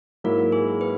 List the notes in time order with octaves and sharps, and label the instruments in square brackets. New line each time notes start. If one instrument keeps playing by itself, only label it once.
[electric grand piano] G#2 F#3 A#3 E4 [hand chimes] A#4
[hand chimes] G#4
B4